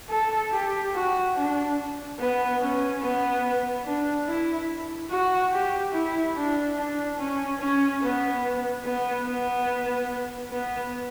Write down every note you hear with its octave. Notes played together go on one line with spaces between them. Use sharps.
A4
G4
F#4
D4
B3
C#4
B3
D4
E4
F#4
G4
E4
D4
D4
C#4
C#4
B3
B3
B3
B3